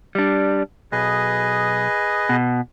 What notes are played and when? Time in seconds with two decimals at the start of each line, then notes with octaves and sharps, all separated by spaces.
0.15 G3 D4
0.92 B1 G#4 B4 D#5
2.29 B2